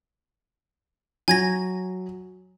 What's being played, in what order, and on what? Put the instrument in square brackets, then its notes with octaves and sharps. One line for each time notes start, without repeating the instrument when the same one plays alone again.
[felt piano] F#3 [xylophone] G#5 G#6 A#6